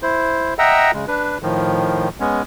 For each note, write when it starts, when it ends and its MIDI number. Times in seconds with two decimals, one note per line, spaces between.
0.02 0.54 64
0.02 0.54 72
0.59 0.91 75
0.59 0.91 76
0.59 0.91 78
0.59 0.91 79
0.59 0.91 82
0.59 0.91 88
0.94 1.05 49
0.94 1.05 56
1.08 1.38 62
1.08 1.38 71
1.43 2.08 45
1.43 2.08 51
1.43 2.08 53
2.20 2.42 56
2.20 2.42 59
2.20 2.42 61